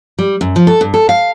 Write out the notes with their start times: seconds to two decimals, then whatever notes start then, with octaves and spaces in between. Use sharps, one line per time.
0.19 G3
0.41 F#2
0.56 F3
0.67 A4
0.81 G2
0.94 A4
1.09 F5